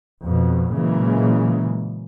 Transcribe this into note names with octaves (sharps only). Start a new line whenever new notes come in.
F2 B2
A#2 C#3 E3 F#3 G#3 A#3